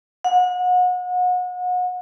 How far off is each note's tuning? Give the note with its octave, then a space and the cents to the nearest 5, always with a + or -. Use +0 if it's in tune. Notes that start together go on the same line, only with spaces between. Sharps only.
F#5 -35